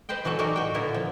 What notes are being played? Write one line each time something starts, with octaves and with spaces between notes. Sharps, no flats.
B4 C5 D#5 G5
E3 F#3 F#4 A4
A2 D#4 F#4 G4 A#4 D5
F#4 G5
A#2 D3 B3 E4 A#4
F3